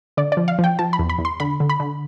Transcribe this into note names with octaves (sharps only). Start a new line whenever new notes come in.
D3 D5
F3 D5
F5
F3
G5
F3 A5
B5
E2
B5
E2
C6
D3 B5
D3
B5
D3